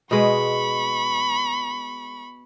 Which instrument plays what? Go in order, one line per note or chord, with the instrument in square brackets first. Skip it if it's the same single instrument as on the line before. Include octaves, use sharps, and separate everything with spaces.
[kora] B2 G#3 B3 [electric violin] B5 C#6